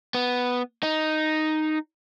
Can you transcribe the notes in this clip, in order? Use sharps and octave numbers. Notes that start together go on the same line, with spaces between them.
B3
D#4